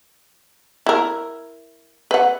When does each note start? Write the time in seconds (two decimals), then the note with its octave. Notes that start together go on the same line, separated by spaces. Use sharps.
0.86 E4 A#4
2.11 B4 F#5